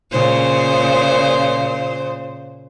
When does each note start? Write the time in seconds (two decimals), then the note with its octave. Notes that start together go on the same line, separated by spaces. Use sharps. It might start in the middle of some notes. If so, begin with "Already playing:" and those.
0.12 A#2 C#3 C5